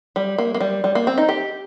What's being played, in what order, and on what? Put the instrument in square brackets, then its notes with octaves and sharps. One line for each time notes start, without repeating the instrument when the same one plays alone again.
[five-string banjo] G3
A#3
A#3
G3
G3
A#3
C4
D#4
G4